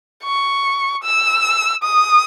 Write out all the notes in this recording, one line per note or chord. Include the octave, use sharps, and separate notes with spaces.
C#6
E6
D#6